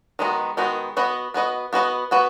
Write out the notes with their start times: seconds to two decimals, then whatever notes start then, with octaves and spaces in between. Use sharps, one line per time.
0.19 D#3 G#3 B3 D#4 F#4
0.57 D#3 G#3 B3 D#4 F#4
0.97 B3 F#4 B4 D#5
1.34 B3 F#4 B4 D#5
1.73 B3 F#4 B4 D#5
2.11 B3 F#4 B4